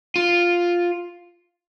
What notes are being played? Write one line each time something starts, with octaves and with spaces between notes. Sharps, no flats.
F4